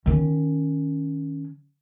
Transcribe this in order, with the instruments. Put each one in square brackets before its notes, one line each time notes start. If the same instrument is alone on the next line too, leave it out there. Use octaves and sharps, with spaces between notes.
[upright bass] D#3 C#4